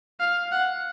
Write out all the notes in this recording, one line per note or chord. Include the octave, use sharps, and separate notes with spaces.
F5
F#5